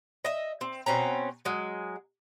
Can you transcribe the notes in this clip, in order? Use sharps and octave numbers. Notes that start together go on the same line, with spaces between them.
D#5 E5
C4
B2 C4 C#4 A#5
F#3 G#3